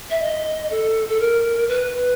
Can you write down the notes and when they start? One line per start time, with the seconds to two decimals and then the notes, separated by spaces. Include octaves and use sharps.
0.10 E5
0.22 D#5
0.71 A4
1.09 A4
1.20 A#4
1.68 B4